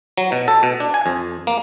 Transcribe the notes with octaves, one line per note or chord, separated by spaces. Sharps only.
F#3
B2
A4
B2
D4
G#5
F2
A#3